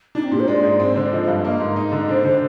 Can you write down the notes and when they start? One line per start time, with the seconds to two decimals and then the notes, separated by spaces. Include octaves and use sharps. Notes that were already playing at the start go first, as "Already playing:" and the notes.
0.15 D4 D#4
0.23 C4
0.32 A#2 G4
0.40 C5
0.48 G#3 D5
0.63 G#2
0.80 C4 C5
0.96 D3 D5
1.12 F3 D#5
1.28 G2 F5
1.44 A#3 D#5
1.60 G#2
1.76 D#4
1.92 D3
2.08 D4 C5
2.24 D3